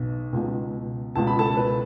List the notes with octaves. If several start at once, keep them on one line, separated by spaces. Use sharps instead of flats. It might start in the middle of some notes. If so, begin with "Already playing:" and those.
Already playing: B1 B2
C#2 B2
C#2 B2 A5
B5
A4 A5
B4